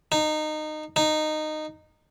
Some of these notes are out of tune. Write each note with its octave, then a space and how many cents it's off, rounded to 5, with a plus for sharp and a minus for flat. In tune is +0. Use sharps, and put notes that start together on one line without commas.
D#4 -20
D#4 -15